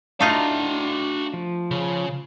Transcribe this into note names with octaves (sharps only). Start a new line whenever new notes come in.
A3 D4 D#4 F4 F#4 F5 A#5
F3
C#3